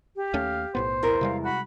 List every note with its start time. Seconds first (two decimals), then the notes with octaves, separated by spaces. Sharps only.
0.16 G4
0.34 D#2 A3 C#4 F5
0.75 B1 A2 B3 C5
1.03 E2 E3 A#4
1.21 C3 G3 G#3 F5
1.44 F#4 B5